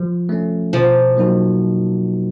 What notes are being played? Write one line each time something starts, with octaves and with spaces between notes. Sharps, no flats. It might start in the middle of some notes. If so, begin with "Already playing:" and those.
Already playing: F3
A3 C#4
B2 F3
F#3 A#3 D#4 F#4